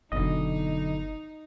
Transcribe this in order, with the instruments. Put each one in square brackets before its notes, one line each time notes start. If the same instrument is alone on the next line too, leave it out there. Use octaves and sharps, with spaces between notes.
[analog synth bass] F#1 [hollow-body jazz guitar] F#2 B2 D3 [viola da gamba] D#4 [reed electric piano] D#5